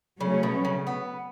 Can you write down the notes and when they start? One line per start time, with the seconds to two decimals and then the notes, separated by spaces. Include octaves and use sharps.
0.21 C#3 F#3 A3 C#4
0.43 B2
0.65 C#3
0.87 B3